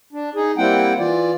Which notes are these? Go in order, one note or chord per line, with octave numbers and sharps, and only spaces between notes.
D4
D#4 G#4
G3 A#3 C4 E4 F#5 G5
E3 F4 D5